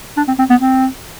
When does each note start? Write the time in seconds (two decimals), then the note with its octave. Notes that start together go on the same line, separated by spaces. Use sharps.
0.17 D4
0.28 C4
0.39 C4
0.50 B3
0.60 C4